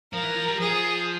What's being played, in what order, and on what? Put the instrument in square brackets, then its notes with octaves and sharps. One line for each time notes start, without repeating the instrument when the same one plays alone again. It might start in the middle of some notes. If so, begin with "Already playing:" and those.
[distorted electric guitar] F3 [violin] A#4
[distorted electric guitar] E3
F3
G3
[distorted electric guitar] F3 [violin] G#4